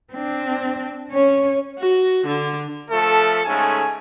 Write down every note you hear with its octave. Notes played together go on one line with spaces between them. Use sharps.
C4 D4
C#4 C#5
F#4
D3
F3 A3 A4
G#2 C#3 A3 G#5